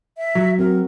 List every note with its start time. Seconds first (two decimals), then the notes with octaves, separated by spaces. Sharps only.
0.17 E5
0.35 F#3
0.59 C4 F#4 A#4